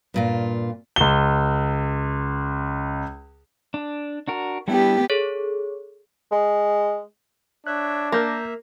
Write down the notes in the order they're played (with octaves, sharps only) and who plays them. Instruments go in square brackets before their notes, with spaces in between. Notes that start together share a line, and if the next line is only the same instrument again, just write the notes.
[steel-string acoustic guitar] G2 A#2 F4
[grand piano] C#2 G7
[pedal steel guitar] D4
D4 F#4 A#4
[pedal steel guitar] G3 D4 E4 [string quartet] B3 G4
[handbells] G#4 A4 C#5
[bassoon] G#3
[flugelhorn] D4 [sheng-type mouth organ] C#5 E5 [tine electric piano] F#6
[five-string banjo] A#3 [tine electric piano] A#4 G6 A#6 [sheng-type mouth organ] E5